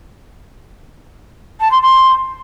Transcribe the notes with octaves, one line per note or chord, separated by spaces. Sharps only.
A5
C6
C6